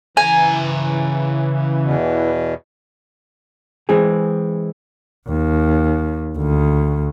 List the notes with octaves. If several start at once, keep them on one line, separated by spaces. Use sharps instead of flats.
C#3 E3 G#5 A#5
E2 B2
E3 G#3 C4 G#4
D#2
D2